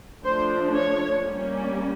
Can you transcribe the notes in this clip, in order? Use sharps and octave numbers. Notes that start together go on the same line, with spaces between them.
F3 A3 D4 C5
C#5
G3 A#3 C#4